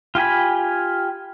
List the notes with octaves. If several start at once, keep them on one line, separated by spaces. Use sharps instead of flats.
F4 G4 G#5 B5